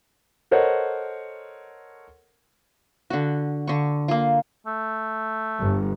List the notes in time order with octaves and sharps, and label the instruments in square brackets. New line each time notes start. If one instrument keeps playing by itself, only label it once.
[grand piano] A4 A#4 C5 C#5 D#5 F#5
[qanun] D3 F#4
D3 C#6
A#3 F4
[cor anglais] A3
[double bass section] G1